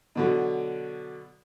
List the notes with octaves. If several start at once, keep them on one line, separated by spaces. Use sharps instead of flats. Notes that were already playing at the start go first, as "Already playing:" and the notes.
B2 D3 F#3